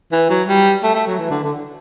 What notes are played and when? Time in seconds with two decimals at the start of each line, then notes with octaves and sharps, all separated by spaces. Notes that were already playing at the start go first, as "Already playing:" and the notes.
0.12 E3
0.30 F#3
0.47 G3
0.83 A3
0.95 A3
1.07 F#3
1.19 E3
1.30 D3
1.43 D3